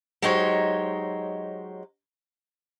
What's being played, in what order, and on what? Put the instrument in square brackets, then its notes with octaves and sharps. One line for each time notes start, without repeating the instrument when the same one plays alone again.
[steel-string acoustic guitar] F#3 G#3 D#4 G4 C5 C#5